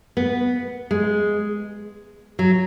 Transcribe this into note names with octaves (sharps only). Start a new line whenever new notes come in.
B3
G#3
F#3